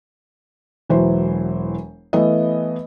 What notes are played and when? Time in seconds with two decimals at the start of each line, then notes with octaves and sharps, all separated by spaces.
0.89 E1 E3 F#3 C5
2.13 E3 A3 B3 D#5